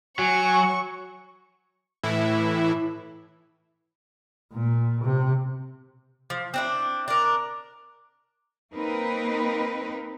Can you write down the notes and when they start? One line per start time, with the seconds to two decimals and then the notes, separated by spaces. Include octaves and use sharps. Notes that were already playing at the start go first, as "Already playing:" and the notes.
0.19 F#3 F#4 G#5 C#6
2.03 A2 E3 E4
4.53 A#2
5.04 C3
6.30 F3
6.54 C4 D4 E4
7.08 D4 A#4
8.74 A#3 C4 D#4 A#4 B4